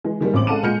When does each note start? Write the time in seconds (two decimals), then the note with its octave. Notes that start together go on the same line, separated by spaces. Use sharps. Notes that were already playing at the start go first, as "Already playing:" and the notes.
0.04 E3 G#3
0.21 D#3 G3 G#3 A#3
0.34 A1 C4 D6 F#7
0.47 G#3 A4 F5 F#5 A5 D#7
0.63 A#2 G#3 F6 G6 C#7